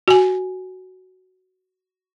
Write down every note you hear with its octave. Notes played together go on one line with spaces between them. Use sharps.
F#4 G#5